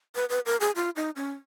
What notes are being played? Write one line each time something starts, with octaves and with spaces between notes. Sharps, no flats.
B4
B4
A#4
G#4
F4
D#4
C#4